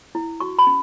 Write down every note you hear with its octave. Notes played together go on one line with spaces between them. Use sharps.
E4
F#4 C#6
B5
C#4